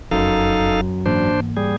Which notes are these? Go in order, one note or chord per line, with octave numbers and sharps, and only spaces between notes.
F1 F#2 D#4 A4 F5
G#2 E3 A#3 D4 C5
G3 G#4